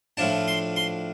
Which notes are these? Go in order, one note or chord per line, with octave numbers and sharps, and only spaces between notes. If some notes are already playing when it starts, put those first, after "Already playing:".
A2 F3 D4 A5
C6
C6